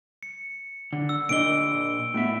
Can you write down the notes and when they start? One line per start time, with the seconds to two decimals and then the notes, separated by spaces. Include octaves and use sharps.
0.23 C#7
0.93 D3
1.09 E6
1.29 A#2 D4 D#5 D7 G7
2.14 A2 B3 E5